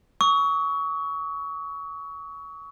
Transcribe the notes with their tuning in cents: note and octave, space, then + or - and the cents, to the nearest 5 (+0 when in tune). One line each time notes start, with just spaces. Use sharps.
C#6 +25 E6 -45